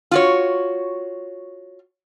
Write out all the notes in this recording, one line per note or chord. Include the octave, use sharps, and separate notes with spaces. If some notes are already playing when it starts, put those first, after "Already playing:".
F4 F#4 C#5